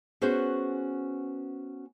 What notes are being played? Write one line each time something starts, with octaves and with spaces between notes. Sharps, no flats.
B3 C#4 F#4 G#4 B4 C5